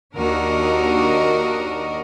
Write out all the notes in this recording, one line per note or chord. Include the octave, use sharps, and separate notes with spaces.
D#2 D4 F#4 A#4 D#5